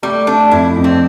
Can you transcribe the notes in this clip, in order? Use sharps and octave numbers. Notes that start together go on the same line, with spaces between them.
G3 A3
A3 D4
F2 E4
F2
C4